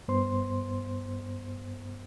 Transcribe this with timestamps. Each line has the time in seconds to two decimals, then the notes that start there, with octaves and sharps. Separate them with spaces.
0.08 G2 B3 C5 C6